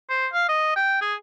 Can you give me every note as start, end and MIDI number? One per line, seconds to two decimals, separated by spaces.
0.10 0.27 72
0.33 0.45 77
0.49 0.73 75
0.76 0.98 79
1.01 1.14 68